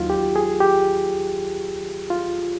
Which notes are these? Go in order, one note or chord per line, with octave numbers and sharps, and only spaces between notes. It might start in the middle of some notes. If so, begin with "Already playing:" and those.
Already playing: D#2 D#3 F#3 F4
G4
G#4
G4
F4